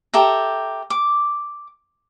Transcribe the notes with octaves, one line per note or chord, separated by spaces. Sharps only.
G4 A4 E5 A#5
D6